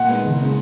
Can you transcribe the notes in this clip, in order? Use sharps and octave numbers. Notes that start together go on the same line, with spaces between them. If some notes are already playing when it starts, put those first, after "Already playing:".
Already playing: A#2 F#5
G#3 B3 D#4
F#1
C#3 G#3